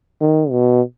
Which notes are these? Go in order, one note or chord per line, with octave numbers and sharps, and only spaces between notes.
D#3
B2